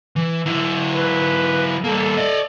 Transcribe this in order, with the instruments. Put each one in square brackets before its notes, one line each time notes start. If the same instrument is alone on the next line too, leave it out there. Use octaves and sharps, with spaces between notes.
[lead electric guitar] E3
F#3 E4
[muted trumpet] B4
[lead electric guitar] G3 A#3 [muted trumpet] A4
[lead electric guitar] D5 D#5